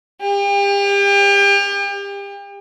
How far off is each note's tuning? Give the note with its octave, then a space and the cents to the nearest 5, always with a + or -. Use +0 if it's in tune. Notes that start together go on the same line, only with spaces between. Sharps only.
G4 +35